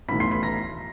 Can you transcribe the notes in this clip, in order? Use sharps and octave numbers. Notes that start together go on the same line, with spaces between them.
B1 A2 E3 B5 B6
C6 C7
B5 B6
A#5 A#6